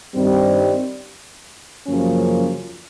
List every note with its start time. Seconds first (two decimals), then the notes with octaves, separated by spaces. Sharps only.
0.15 G2 D#3 G3 C4
1.87 F#2 C#3 F3 A#3 C#4